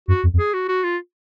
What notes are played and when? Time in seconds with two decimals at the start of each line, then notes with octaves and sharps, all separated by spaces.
0.08 F#2 F#4
0.23 F2
0.33 F2
0.39 G#4
0.54 F#4
0.68 F#4
0.84 F4